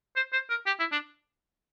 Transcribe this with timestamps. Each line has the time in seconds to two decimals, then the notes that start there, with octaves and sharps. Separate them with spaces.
0.16 C5
0.33 C5
0.50 A#4
0.67 G4
0.80 E4
0.92 D4